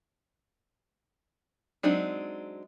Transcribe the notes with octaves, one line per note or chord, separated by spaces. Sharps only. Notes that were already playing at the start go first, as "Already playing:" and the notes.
F#3 G#3 C4 D4 D#4